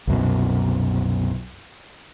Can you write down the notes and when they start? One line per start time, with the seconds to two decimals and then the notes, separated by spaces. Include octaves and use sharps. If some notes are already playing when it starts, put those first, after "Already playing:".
0.07 C2 F#2 B2